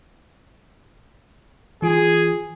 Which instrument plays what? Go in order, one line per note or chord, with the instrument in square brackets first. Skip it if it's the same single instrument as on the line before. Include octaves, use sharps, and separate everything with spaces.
[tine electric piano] E3 F4 [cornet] G#4